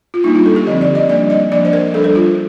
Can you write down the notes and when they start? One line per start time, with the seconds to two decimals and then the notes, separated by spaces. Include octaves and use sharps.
0.14 F4
0.24 G3 A#3 D4 D#4
0.35 F4
0.46 A4
0.56 G4
0.67 D3 F3 C4 D#5
0.81 D5
0.95 D#5
1.09 G3 A#3 D4 D5
1.30 D#5
1.52 F3 A#3 D4 D5
1.65 C5
1.73 A#4
1.94 G3 A4
1.97 D4
2.04 A4
2.15 F4